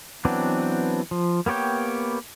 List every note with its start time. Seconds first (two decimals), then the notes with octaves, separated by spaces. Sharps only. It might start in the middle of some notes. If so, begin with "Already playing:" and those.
0.25 E3 F#3 B3 C4 D4
1.11 F3
1.46 A#3 B3 G4 C#5 G5